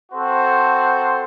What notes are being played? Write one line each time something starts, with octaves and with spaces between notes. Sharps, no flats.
C4 F#4 A4 C5